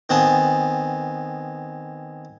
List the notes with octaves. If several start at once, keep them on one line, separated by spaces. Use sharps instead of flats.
D#3 B3 C4 G#4 A5